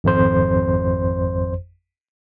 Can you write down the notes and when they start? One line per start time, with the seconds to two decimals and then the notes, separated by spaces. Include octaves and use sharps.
0.04 G#1 F2 C5